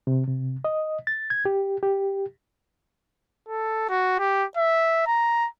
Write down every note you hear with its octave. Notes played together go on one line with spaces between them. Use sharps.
C3
C3
D#5
A6
G#6
G4
G4
A4
F#4
G4
E5
A#5